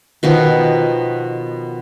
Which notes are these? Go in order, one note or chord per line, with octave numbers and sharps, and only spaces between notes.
B2 D#3 F3 B3